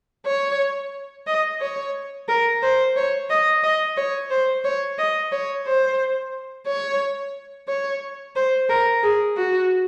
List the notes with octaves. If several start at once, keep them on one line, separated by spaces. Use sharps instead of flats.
C#5
D#5
C#5
A#4
C5
C#5
D#5
D#5
C#5
C5
C#5
D#5
C#5
C5
C#5
C#5
C5
A#4
G#4
F#4